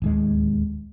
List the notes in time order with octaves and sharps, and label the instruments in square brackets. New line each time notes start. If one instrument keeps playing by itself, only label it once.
[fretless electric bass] D1 D#2 G#3